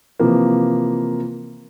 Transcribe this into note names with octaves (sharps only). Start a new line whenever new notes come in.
C3 E3 F3 A#3